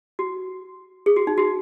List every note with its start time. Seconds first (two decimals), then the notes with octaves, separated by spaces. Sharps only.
0.19 F#4
1.06 G#4
1.16 F#4
1.27 D#4
1.38 F#4